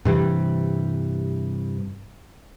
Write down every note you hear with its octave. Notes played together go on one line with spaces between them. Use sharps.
G2 C3 E3 G3